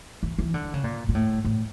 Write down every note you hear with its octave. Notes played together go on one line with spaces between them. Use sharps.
E3
E3
D3
C#3
A#2
A#2
A2
A2